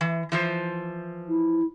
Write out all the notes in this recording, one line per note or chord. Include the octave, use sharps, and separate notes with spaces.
E3
E3 F3 C5
E4